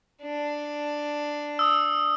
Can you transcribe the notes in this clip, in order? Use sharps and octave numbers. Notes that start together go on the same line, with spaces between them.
D4
D#6 E6